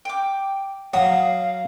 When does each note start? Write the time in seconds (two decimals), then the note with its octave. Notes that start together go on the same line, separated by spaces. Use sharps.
0.05 G5 D6
0.94 F#3 F5 F#5 D#6